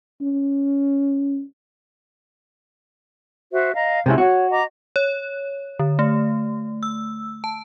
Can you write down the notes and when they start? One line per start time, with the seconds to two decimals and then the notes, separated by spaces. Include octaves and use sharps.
0.21 C#4
3.53 F#4 C5 E5
3.74 D#5 F5 A#5
4.06 C3 G#3 C#4 E4
4.18 F#4 C#5
4.51 D#5 A#5 D6
4.96 C#5
5.79 D3
5.99 A3
6.83 E6
7.44 A5